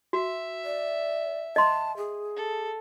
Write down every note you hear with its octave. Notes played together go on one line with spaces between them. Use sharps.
F#4 E5
D5
D#5 A5 C6
G#4
A4